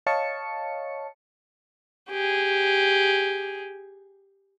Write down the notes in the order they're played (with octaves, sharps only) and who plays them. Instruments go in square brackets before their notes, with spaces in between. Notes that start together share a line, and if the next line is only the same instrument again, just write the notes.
[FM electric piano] C#5 D#5 F5 A5 C#6 C#7
[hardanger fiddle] G4 G#4